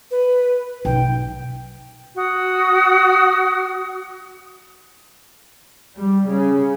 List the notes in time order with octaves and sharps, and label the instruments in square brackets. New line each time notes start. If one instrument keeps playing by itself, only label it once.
[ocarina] B4
[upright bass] B1 [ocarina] G5
[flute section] F#4 D#6
[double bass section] G3
C#3